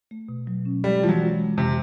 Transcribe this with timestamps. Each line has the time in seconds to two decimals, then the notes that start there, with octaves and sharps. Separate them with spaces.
0.11 A3
0.29 B2
0.47 F#3
0.65 C#4
0.84 G3 G#3
1.02 E3 F3
1.09 F#3
1.20 G#3
1.39 G#3
1.58 F2 C3